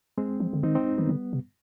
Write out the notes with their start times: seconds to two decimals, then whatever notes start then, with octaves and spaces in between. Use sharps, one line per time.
0.18 G#3 C4
0.40 F3
0.53 D3
0.63 D#3 C4 D#4
0.75 C4 D#4
0.98 D#3 G3 B3
1.09 D3
1.33 C3